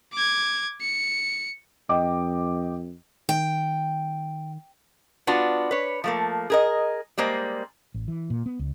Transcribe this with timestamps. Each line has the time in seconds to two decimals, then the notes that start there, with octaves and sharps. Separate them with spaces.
0.13 D6 G#6
0.81 C#7
1.89 F2 D#5 G5 D6
3.29 D#3 G5
5.27 B3 D4 F4 F#4
5.71 B4 C#5
6.04 F3 A3 A#3
6.50 G#4 A#4 D#5
7.18 G3 G#3 A#3 C5
7.94 A1
8.08 E3
8.30 A#2
8.46 B3
8.59 C#2